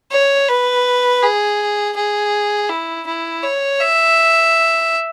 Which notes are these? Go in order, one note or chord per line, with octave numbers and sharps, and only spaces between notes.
C#5
B4
G#4
G#4
E4
E4
C#5
E5